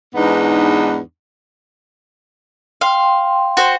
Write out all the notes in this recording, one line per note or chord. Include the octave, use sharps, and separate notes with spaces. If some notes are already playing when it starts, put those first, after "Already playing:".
E2 G#2 B3 D4 D#4
F5 G5 C6
F#4 C5